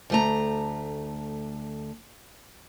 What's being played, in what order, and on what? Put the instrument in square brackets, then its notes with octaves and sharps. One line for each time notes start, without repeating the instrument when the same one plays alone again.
[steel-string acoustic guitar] D2 A3 A#5